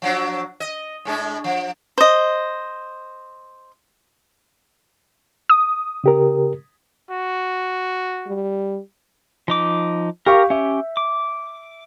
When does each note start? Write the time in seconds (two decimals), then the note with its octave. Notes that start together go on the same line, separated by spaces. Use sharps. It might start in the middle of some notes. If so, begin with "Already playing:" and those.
0.02 F3 F#3 D4
0.60 D#5
1.05 A2 G#3 D4
1.44 F3
1.98 C5 D#5
5.50 D#6
6.04 C#3 G4 A#4
7.10 F#4
8.27 G3
9.48 F3 D#4 D6
10.26 G4 A#4 F5 C#6
10.50 C#4 G4 E5
10.97 D6